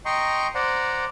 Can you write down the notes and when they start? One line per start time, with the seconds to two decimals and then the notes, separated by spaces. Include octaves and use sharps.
0.05 D#5 G5 A#5 C6 C#6
0.55 C5 D5 F#5 A#5